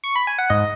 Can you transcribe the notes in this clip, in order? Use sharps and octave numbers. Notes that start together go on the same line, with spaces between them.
C#6
B5
G#5
F#5
G#2 D#5